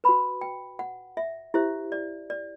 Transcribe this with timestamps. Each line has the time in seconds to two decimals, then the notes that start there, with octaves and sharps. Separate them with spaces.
0.04 F#4 B4 B5
0.41 G5
0.79 F#5
1.17 E5
1.54 E4 G4 C5 E5
1.92 D5
2.30 D5